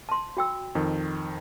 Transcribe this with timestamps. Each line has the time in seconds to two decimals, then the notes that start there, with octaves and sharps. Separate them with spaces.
0.09 A5 C6
0.37 F#4 G5 E6
0.75 F2 D#3